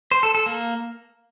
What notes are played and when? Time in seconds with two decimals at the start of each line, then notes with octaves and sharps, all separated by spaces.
0.11 C5
0.23 A4
0.35 A4
0.46 A#3